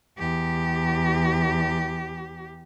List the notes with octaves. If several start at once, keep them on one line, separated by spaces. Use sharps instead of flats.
E2 G4